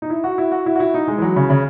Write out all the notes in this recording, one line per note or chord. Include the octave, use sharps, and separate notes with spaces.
D#4
E4
F#4
E4
F#4
E4
F#4
E4
D#4
G#3
E3
F#3
C#3
C#3